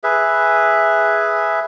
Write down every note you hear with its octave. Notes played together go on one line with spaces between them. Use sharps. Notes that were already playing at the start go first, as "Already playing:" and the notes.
G#4 B4 E5